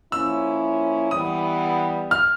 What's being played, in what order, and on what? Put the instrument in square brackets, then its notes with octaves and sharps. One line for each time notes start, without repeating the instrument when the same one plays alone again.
[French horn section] F3 A#3 C#4 E4 [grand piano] E6
[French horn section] E3 G3 B3 [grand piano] D#6
[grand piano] F6